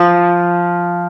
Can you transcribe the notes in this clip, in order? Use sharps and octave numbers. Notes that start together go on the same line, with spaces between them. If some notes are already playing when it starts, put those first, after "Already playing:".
Already playing: F3